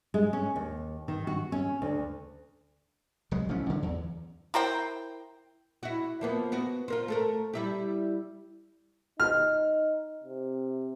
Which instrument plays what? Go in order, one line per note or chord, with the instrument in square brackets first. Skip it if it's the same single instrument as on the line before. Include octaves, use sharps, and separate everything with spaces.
[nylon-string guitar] G#3
C#4
D#2
D#3
F#4
C#4
D2
[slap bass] C2 F#3 G#3
A1 F3 A3 C#4
D3 F#3
E2
[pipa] E4 A#4 C5 G5
[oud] E4 F#4
F3 A#3 B3
B3 F#4
F4 A#4 C5
A3 A4 A#4
G3 E4 G4
[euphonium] D#4 [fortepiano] F6
[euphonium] C3